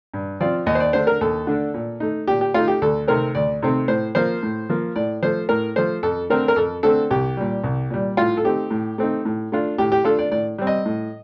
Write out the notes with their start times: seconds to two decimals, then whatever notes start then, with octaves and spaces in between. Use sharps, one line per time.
0.14 G2
0.40 F3 C4 F4 D5
0.66 D#2 D#5
0.75 C5
0.80 D5
0.93 D3 A3 D4 C5
1.07 A#4
1.21 D#2 A4
1.47 D3 A3 D4
1.74 A#2
2.00 A3 D#4
2.27 A#2 G4
2.41 G4
2.54 A3 D#4 F4
2.68 G4
2.82 D2 A4
3.08 C3 D#3 A3 C4 A#4
3.35 D2 D5
3.62 C3 D#3 A3 C4
3.88 A2 C5
4.15 F3 A#3 C5
4.43 A2
4.70 F3 A#3
4.96 A2 D5
5.22 F3 A3 C5
5.49 A2 A#4
5.76 F3 A3 C5
6.03 F2 A4
6.30 D3 A3 C4 A#4
6.48 A#4
6.56 F2 A4
6.83 D3 A3 C4 A4
7.10 C2 G4
7.37 A#2 G3
7.64 C2
7.90 A#2 G3
8.17 A2 F4
8.37 A4
8.44 A3 C4 D#4 G4
8.70 A2
8.98 A3 C4 D#4
9.25 A2
9.52 A3 D4 F4
9.78 A2 G4
9.92 G4
10.05 A3 D4 F4 A4
10.19 D5
10.31 A2 D5
10.58 G3 C4
10.67 D#5
10.85 A2